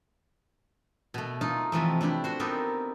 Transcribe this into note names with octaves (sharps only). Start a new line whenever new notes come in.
B2 A3
A3 D#4 F4 F5
C3 E3 F3 A3
A3 D4 E4 G4
F#4 C5
B3 C4 D#4 G4 A4 A#4